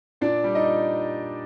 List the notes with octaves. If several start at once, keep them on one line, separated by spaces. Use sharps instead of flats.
A#2 D4 D5
G3
D#4 D#5
A#2